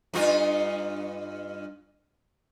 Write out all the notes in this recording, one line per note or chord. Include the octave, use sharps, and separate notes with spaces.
G2 D#4 F4